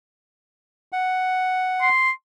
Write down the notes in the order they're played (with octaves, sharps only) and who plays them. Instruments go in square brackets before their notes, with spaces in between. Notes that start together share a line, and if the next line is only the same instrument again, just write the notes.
[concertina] F#5
[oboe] C6